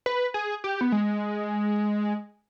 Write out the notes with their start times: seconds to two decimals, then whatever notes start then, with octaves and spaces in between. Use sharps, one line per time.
0.06 B4
0.34 G#4
0.64 G4
0.81 B3
0.92 G#3